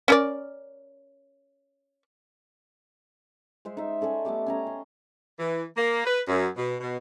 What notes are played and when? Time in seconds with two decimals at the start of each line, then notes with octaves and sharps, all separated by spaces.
0.08 C#4 A#4 D5
3.65 G#3 C5 E5
3.77 D#4 E5
4.01 C#4 A4 D5 G#5
4.25 A3 B3 G4 D6
4.46 C#4 G#5 A#5
4.67 C6
5.39 E3
5.76 A#3
6.05 B4
6.28 F#2
6.56 B2
6.80 B2